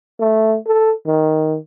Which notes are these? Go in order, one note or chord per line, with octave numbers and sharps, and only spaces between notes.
A3
A4
D#3